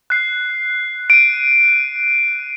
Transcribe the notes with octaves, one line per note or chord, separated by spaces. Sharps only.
F#6 C7
D7 D#7